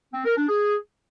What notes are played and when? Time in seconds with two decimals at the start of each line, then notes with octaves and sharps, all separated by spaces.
0.13 C4
0.25 A#4
0.37 D4
0.49 G#4